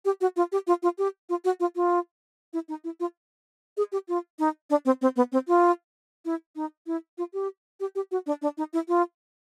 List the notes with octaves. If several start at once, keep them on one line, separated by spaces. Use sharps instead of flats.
G4
F#4
F4
G4
F4
F4
G4
F4
F#4
F4
F4
E4
D#4
E4
F4
G#4
G4
F4
D#4
D4
C4
C4
B3
C4
F4
E4
D#4
E4
F4
G4
G4
G4
F#4
D4
D4
D#4
E4
F4